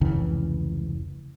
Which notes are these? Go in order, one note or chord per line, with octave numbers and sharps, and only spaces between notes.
F1 C#2 C#3 E3